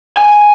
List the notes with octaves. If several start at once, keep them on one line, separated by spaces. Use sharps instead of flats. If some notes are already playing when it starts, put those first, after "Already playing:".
G#5